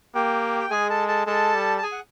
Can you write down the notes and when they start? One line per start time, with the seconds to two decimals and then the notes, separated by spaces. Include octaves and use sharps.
0.15 A#3 G4 G5
0.60 G5
0.70 G#3 G#4 G#5
0.90 A4 A5
1.08 A4 A5
1.26 G#3 A4 A5
1.54 G3
1.78 A5
1.83 G#4 G#5
1.92 F#5